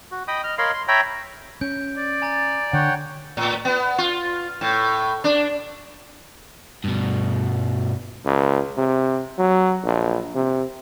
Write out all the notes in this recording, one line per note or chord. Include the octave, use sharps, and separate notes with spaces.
F#4
D#5 G5 B5 D#6
D#5 F6
A#4 C#5 D#5 F5 B5 C6
C6
C#5 E5 G5 A#5 B5
C#4 G6 D7
D5
G#5 A#5 A6
D3 C#5 F#5 G5
A2
B3
F4
A2
D4
G2 B2
C#2
C3
F#3
A#1
C3